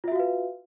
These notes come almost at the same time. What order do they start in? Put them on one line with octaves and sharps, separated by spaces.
F4 E5 F#4 F5 B4